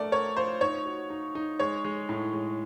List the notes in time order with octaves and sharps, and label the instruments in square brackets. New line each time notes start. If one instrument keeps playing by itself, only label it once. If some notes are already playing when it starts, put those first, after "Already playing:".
Already playing: [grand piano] A3 A#4 [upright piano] D5
[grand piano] A#4 [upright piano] C#5
[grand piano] F4 [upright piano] C5
[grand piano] D#4 [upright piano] C#5
[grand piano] F#4
D#4
D#4
[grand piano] G#3 [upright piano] C#5
[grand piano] G#3
A2
G#3